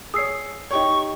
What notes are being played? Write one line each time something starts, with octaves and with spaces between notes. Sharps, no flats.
G#4 C#5 D#6 E6 C7
D#4 G4 C#5 C#6